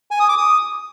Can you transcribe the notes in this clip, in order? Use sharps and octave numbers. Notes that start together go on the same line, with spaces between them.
G#5
D#6
D6
D#6